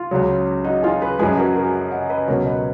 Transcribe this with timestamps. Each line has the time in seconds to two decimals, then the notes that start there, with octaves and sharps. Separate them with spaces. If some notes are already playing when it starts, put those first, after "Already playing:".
Already playing: F4
0.11 C#2 C#3 F#3
0.64 D#4 F#4
0.83 F4 G#4
1.01 G#4 B4
1.19 F#2 F3 G#3 G#4 B4
1.37 F#4 A#4
1.56 F#4 A#4
1.91 D#5 F#5
2.10 B4 D#5
2.28 C#2 B2 F#3 A#4 C#5
2.46 B4 D#5